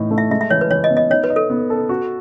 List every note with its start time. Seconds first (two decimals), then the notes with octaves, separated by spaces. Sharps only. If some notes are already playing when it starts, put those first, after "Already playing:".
Already playing: A2 E3 D#4
0.11 A3
0.18 E5
0.31 G#3 E5
0.41 E5
0.50 E3 C#5
0.61 B4
0.70 E3 C#5
0.84 D#5
0.90 B3
0.97 D#5
1.10 D#4 C#5
1.24 B4
1.30 D#5
1.36 A4
1.50 B3
1.70 A4
1.89 F#4